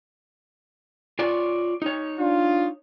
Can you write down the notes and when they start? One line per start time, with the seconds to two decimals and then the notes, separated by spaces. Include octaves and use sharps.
1.19 F4 C#5 D5
1.82 D#4 C#5
2.19 D4 F4